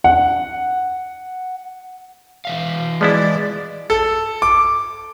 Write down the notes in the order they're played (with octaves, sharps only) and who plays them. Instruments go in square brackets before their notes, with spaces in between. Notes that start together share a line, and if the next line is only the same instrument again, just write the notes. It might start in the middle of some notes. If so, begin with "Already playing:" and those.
[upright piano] F#5
[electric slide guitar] E3 E5 F5
[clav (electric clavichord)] F3 B3 E4 [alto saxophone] G#3 [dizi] D5
[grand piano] A4
D6